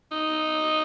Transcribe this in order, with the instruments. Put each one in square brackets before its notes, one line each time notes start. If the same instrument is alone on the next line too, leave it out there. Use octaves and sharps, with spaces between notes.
[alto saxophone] D#4